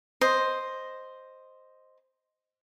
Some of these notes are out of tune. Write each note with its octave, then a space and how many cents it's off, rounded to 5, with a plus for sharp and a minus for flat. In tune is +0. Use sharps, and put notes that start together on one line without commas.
C5 +0 D#5 +0 C6 +0